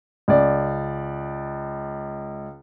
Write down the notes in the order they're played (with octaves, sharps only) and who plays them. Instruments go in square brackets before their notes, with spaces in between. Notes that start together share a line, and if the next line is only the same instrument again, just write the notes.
[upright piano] C#2 D5